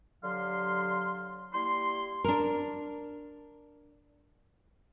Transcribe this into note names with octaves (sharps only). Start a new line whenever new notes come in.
D3 F#3 G4 F5 C6
G3 A#3 E4 C6
D4 A#4